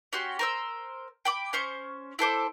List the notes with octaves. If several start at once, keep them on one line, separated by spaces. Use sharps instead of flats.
C#4 F#4 G4 C6
A#4 C5 E6
G5 B5 D6
C#4 C5 C#6
E4 A4 C5 D6